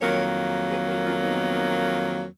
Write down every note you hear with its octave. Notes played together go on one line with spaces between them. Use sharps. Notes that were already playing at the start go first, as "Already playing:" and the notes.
F2 D#3 F#3 A#3 A#4 C#5
G#4 B4
F#4 A#4
C#4 F4
B3 D#4